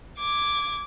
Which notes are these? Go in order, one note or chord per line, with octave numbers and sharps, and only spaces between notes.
D6 G#6